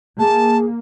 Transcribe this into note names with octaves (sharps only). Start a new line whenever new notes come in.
A#3 G#4 A5